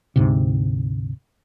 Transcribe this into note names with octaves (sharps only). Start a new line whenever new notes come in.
D2 G#2 C3